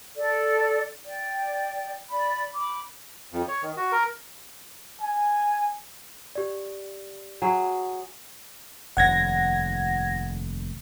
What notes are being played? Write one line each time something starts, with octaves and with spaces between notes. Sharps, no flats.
A4 D5
D5 G5
D5 B5
B5 D6
F2
C#5
D#3
F#4
A#4
G#5
G4 D5
F#3 G#4
F1 D#2 F#5 G#6 A#6